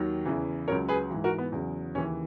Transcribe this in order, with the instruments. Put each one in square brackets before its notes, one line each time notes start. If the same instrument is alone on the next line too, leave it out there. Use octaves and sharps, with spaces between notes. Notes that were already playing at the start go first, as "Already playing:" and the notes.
Already playing: [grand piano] D#2 D#3 F#3
E2 C#3 E3
C#2 C#3 F#3 A#4 C#5
G#4 B4
G#2 E3
F#4 A#4
B3
E2 C#3 F#3
D#2 C#3 E3 C#4